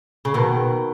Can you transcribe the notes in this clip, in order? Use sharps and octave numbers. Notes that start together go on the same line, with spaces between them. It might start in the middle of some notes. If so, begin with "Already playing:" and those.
C#3
B2 D#3